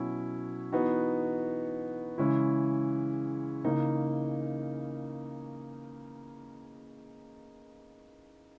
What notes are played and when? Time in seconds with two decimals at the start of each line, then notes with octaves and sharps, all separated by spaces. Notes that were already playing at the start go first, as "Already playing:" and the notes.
Already playing: B2 F#3 C#4 E4
0.72 E3 B3 D#4 F#4
2.18 C#3 E3 G#3 C#4 E4
3.64 C#3 E3 A#3 D#4